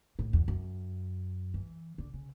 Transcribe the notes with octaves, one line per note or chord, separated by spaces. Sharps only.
A2
E2
F#2
E3
D3
C#3